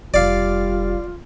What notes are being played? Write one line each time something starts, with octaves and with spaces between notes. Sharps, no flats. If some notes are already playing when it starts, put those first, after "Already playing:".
F1 G3 F4 D5 F5